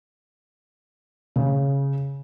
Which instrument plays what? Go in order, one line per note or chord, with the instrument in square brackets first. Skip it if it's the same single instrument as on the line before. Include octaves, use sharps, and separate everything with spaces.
[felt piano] C#3